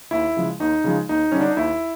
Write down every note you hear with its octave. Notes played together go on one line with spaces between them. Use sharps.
D#2 E4
C#3 F3 G#3
D#2 D#4
C#3 F3 G#3
D#2 D#4
D3 G3 C#4
D4
D#4
D#2 E4